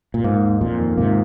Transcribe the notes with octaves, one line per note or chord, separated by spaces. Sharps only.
A#2
G#2 A#3
D#2
F2 A#2 F4
D#3
G#2 C3 A#3